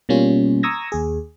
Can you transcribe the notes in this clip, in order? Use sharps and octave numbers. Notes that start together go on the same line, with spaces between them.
B2 G3 A#3 C#4 F4
A#5 C#6 D#6 E6 G#6 A#6
D#2 G#4